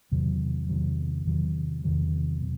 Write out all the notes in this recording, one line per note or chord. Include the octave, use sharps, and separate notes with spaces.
E2 C3 D#3 F#3
E2 C3 D#3 F#3
E2 C3 D#3 F#3
E2 C3 D#3 F#3
B2